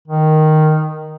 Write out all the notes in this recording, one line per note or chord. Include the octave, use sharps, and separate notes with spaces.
D#3